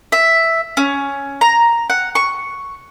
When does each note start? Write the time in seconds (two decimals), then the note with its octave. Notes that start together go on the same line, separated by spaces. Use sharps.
0.12 E5
0.77 C#4
1.41 A#5
1.90 F#5
2.15 C#6